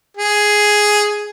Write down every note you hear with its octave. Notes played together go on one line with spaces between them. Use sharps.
G#4